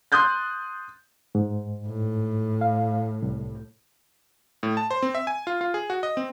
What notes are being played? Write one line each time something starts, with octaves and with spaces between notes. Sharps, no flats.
C6 D#6 F#6 G6 A6
G#2
A2
F5
C2
A2
A5
C5
C4
E5
G#5
F4
F4
G#4
F#4
D#5
C4